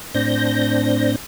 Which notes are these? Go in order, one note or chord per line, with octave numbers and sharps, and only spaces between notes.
A2 C4 D4 G6 A#6